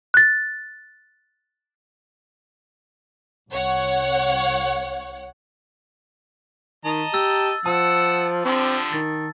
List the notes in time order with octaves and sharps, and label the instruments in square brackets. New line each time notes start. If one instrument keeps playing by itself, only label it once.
[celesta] F#6 A6
[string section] C2 C#5 F#5
[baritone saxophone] D#3 [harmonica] D#5 A5 A#5
[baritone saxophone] G4 [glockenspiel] E6 A6
[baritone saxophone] F3 [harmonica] F#5 E6 [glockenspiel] A5
[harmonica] D3 F3 G4 [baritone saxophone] C4
[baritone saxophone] D#3 [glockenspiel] A6